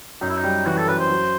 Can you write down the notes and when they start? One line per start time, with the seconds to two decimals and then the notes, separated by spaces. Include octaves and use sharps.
0.21 F#2 D#4
0.29 E4
0.37 D#4
0.44 G3
0.66 E3 F#4
0.77 A4
0.88 F#2 B4
0.99 C5
1.09 F#3